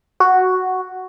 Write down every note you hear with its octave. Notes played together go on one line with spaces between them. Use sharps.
F#4